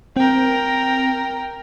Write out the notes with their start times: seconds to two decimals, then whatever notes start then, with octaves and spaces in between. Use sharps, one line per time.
0.16 C4 A#4 G5